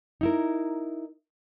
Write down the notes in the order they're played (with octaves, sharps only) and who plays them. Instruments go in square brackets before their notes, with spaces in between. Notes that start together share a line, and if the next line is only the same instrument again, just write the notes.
[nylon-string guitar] D#4 E4 A#4